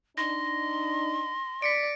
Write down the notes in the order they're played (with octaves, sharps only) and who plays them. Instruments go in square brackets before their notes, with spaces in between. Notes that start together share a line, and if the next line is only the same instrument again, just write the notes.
[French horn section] D4 D#4 [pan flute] C6 [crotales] A#6
[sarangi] D5 [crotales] B6 C#7 D7